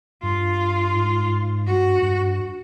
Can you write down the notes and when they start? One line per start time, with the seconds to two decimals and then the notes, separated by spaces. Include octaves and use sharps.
0.23 G2 F4
0.95 G#2
1.67 G2 F#4
2.03 G2